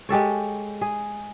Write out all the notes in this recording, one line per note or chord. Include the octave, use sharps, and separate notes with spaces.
G#3 G4 A4 C#5
G#4